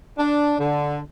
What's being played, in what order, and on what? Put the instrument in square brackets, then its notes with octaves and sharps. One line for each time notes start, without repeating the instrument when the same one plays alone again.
[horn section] D4
D3